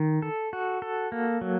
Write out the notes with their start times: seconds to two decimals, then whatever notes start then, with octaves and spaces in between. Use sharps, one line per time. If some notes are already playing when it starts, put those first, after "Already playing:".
Already playing: D#3
0.22 A4
0.53 F#4
0.82 A4
1.12 A#3
1.41 F#3